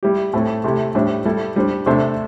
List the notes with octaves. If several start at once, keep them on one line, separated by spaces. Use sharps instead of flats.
G3 E4 G4
A2 A3 C4 E4
C3 A3 E4 G4
A2 G3 D4 C5 E5
G3 E4 A4
G3 D4 C5
C3 A3 D4 C5 E5